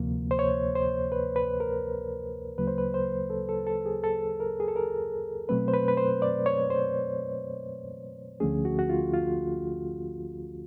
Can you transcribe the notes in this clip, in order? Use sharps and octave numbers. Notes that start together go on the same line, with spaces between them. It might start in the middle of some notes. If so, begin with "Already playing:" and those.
Already playing: D2 C3 F3 A#3
C5
C#5
C5
B4
B4
A#4
D2 C#3 F#3 A#3 B4
C5
B4
C5
A4
A4
A4
G#4
A4
A#4
G#4
A4
A#4
B2 F#3 A3 C4 B4
C5
B4
B4
C5
D5
C#5
C5
D2 D3 F3 A3 C#4 G#4
F#4
F#4
F4
F4